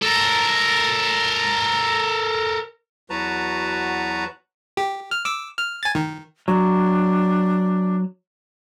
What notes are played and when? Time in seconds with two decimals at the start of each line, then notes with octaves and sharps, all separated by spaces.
0.02 A4 A#4
3.10 E2 F#3 F#4 B4 A5 A#5
4.77 G4
5.11 F6
5.25 D6 E6
5.58 F6
5.83 G#5 A6
5.95 D#3
6.48 F#3 D4